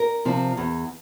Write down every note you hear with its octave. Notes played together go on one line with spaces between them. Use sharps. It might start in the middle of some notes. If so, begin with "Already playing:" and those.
Already playing: A#4
C3 F3
E2